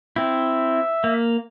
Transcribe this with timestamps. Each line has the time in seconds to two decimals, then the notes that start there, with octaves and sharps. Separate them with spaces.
0.16 C4 E4 E5
1.04 A#3